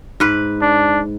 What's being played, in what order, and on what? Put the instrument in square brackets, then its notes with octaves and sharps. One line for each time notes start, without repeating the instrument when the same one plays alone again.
[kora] G#2 B4
[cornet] D4